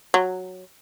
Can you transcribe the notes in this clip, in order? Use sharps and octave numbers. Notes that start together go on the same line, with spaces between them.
F#3